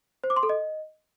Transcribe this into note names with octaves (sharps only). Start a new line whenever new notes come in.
C5
D6
C6
A4
D#5